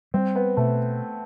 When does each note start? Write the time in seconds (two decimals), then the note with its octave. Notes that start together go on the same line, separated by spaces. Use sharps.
0.14 G3 C4
0.35 B3
0.57 B2 A3